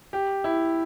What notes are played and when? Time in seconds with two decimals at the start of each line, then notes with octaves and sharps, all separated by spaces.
0.13 G4
0.44 E4